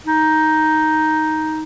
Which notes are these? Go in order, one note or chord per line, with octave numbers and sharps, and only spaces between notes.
D#4